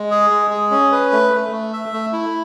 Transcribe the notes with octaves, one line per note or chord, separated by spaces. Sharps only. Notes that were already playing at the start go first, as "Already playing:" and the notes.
Already playing: G#3
G#4
G#3
G#4
C#4
B4
A3
A3
A3
E5
A3
E4